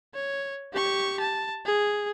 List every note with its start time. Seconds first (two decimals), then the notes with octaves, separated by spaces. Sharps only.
0.14 C#5
0.73 G4 C#6
1.20 A5
1.65 G#4